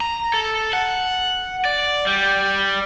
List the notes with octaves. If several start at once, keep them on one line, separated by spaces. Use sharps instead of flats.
A#5
A4
F#5
D5
G3